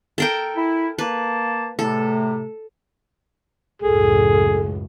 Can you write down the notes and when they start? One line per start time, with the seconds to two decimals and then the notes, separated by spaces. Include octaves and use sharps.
0.18 A4 A#4 G5
0.56 E4
0.99 A#3 B4 A5
1.79 E2 A2 C3 A3 A4
3.82 C#2 F#2 A2 G#4 A4